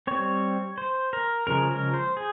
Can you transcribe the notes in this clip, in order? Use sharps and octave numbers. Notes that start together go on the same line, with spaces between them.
G3 C4 C#5
C5
A#4
C#3 F3 G#3 A#4
A#4
C5
G#4